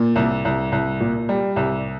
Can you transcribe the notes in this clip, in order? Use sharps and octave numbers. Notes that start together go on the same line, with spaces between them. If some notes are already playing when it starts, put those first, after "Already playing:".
Already playing: A#2
C2
C2
C2
A#2
G3
C2